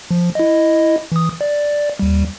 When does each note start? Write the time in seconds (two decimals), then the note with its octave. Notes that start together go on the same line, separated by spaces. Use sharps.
0.11 F3
0.35 E4 D#5
1.12 E3 D#6
1.41 D5
1.99 D#2 G3